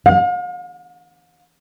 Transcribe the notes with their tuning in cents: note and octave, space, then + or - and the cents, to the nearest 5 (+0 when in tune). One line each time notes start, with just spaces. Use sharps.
F5 +40